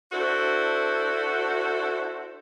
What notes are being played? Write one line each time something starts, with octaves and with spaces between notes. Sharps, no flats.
D4 E4 F#4 A4 C5